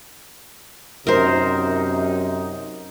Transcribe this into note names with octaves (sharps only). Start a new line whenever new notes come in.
F#2 C3 D#4 A#4 C5